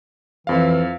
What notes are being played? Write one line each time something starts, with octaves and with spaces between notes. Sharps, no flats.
F2 E3 F5